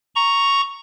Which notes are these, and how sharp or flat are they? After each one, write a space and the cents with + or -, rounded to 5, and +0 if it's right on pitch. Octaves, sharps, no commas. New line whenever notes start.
A#5 +0 C#6 +0